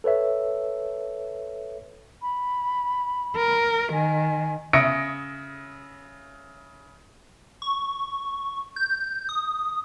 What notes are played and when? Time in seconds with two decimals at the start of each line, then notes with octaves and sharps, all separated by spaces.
0.04 A4 B4 C#5 E5
2.22 B5
3.37 A#4
3.93 D#3 G#5
4.73 C#3 E5 D#6 A#6 C#7 D7
7.62 C#6
8.76 G6
9.29 D#6